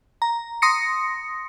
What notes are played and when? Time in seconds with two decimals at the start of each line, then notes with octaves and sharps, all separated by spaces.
0.22 A#5
0.62 C6 D#6 A#6 C#7